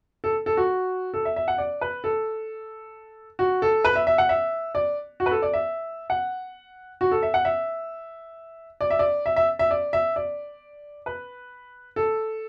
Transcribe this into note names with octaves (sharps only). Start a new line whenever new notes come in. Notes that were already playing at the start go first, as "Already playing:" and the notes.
A4
A4
F#4
A4
E5
E5
F#5
D5
B4
A4
F#4
A4
B4
E5
E5
F#5
E5
D5
F#4
B4
A4
D5
E5
F#5
F#4
A4
E5
F#5
E5
D5
E5
D5
E5
E5
E5
D5
E5
D5
B4
A4